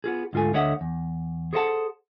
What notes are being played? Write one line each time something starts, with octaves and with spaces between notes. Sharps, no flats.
B3 F4 G#4
D2 G#2 F4 A4 G#5
D2 D3 C#5 D#5 E5 F#5
E2
G#4 A4 C5 D#5 F#5 A5